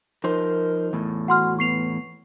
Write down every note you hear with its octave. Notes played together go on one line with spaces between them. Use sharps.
F3 D#4 A#4 C5
E2 A2
F#4 F#5 C6 F6
B3 C#6 C7 F7